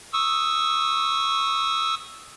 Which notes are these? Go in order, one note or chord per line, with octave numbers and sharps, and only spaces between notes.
C#6 D#6 E6